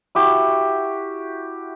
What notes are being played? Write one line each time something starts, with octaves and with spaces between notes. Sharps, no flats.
E4 F#4 G4